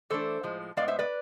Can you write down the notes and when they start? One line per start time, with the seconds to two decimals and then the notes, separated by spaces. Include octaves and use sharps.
0.10 E3 A3 D4 A4 C5
0.43 A2 F3 G#3
0.77 A2 G#3 B3 D5 F5
0.88 C5 E5
0.99 B4 D5